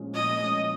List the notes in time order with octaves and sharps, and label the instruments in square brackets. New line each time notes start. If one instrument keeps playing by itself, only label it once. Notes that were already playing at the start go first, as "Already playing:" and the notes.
Already playing: [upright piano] A#2 F3 G#3 C#4
[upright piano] A#2 [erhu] D#5
[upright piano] F3 G#3 C#4